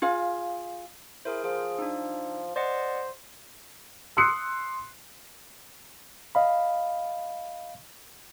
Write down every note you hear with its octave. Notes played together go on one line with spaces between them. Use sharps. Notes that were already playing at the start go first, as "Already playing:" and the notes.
F4 G#4 F5
E4 G#4 A#4 C5
F3 G#4
D4 D#4
C5 D5 D#5 F#5
C6 D#6 E6 F#6 C7 C#7
D#5 F5 B5